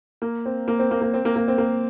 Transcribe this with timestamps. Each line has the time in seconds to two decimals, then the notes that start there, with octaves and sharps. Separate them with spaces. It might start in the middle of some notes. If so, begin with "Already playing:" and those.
0.22 A#3
0.46 C4
0.68 A#3
0.79 C4
0.91 A#3
1.01 A#3
1.14 C4
1.25 A#3
1.36 A#3
1.48 C4
1.58 A#3